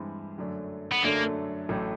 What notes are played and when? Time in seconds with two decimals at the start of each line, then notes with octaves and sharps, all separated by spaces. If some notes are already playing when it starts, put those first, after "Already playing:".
Already playing: G2 E3 G#3 C4
0.38 F#2 D3 F#3 A3 D4
0.92 B3
1.03 F#2 D3 F#3 A3 A#3 D4
1.69 A1 A2 F#3 A3